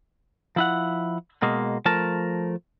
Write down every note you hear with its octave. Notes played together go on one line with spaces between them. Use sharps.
F3 E4 F#5
B2 G#3 A#3
F3 A3 A#4 A5